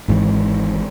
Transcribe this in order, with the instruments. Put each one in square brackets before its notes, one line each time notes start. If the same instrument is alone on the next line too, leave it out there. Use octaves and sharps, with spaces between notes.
[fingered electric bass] G#1 G#2 C#3 E3